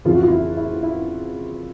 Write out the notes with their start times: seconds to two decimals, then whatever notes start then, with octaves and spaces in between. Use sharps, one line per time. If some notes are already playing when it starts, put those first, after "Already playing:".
0.05 F2 C#3 E3 F4
0.15 F#4
0.23 F4
0.32 E4
0.57 E4
0.83 E4